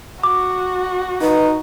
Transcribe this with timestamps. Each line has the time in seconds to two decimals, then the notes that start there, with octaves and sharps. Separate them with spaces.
0.24 F#4 D6
1.21 D#4 B4